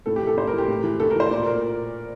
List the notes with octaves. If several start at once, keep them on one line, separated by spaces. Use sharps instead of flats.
A2 A4
G4
E3 A4
A2 C5
A#4
E3 G4
A2
E3
A2 A4
A#4
E3 C5
A#2 D5
A#2 A#4